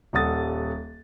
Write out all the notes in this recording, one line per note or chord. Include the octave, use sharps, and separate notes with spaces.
D#1 G3 A4 F#5 D#6 A6